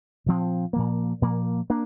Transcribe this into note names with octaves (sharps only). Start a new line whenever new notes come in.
A#2 F3 C4
A#2 F3 A#3
A#2 F3 A#3
A#3 D4